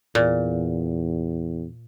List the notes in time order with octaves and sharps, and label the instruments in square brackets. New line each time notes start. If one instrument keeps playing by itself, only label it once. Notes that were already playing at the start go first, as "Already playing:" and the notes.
[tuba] E2 [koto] A#2